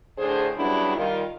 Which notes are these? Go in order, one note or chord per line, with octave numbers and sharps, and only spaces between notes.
A2 D3 D4 G#4 C5
C#3 F#3 G3 B3 D4 E4
D#3 G3 F4